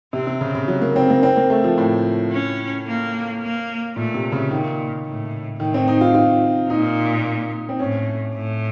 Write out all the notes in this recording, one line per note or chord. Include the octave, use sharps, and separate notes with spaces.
C3 C4
C3
C#3
C#3
F#3
A#3
C4
A#3
C4
A#3
A3
F3
A2
C#4
A#3
A#3
A#2 A3
C3
C#3
A#2 D#3
A2
A2 D#3
C4
D#4
F4
F4
A#2 D#4
C4
A2 C#4
A2